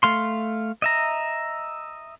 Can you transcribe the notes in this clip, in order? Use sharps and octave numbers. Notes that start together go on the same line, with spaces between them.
A3 F5 C6
D#5 E5 A#5